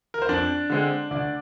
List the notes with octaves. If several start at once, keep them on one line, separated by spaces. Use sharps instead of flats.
A#4
C5
F2 D4 D5
D3 G#3 C4
D2 D4 D5